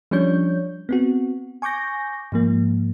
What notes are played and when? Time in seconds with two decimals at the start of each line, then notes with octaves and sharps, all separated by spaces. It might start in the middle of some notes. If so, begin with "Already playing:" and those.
0.11 F3 G3 C#4 D4 C#5 G6
0.89 B3 C4 F#4
1.62 G#5 C#6 D6 G6 A#6
2.32 G#2 F3 A#3